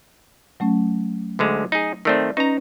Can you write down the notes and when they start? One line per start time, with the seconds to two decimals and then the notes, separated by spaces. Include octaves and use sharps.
0.60 F#3 A3 C#4
1.39 D2 D3 G#3
1.72 D#4 G#4
2.05 D#3 A3 C4 D5 E6
2.37 C#4 D#4 B4 A#5